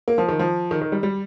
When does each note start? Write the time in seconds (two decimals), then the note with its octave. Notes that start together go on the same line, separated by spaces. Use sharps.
0.08 A#3
0.18 F3
0.28 D#3
0.39 F3
0.71 D#3
0.82 D#3
0.92 G3
1.03 G3